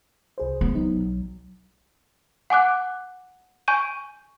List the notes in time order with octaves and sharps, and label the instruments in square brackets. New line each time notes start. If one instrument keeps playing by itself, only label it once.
[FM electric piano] C2 G#4 C5
[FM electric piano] G#3 [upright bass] B3
[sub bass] F#3 [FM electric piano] D#4
[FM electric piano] B1
[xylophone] F#5 G#5 D6 F#6
G#5 C#6 G6 D#7